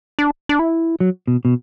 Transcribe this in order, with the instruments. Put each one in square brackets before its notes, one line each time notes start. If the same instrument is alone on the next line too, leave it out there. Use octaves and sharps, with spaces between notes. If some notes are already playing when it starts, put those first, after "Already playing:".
[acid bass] D4
D4
E4
[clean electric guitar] F#3
B2
B2